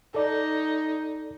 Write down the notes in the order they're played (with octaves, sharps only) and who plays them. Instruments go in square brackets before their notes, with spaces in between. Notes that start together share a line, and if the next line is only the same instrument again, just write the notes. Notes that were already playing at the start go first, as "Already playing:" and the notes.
[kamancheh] D#4 [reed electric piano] A4 D5